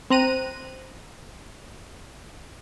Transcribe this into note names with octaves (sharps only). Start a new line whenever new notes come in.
C4 C5 A#5 F#6 D#7